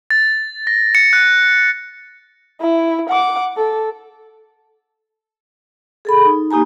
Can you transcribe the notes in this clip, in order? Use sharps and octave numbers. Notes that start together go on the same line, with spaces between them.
A6
A#6
C#7
F#6
E4
F#5 D6
A4
G#4 A4 B5
D#4
A#3 D#4 G4 G#5 A#5